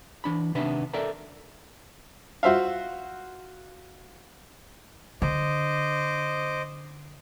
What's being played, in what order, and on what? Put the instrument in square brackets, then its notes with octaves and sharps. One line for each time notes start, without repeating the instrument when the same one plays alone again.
[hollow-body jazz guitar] E3 D4 B5
C3 D#3 B3 D4 E5 B5
A4 A#4 D5 E5 A#5
[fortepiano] F4 F#4 C5 E5 F5
[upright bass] D3 [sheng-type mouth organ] C5 D#5 D6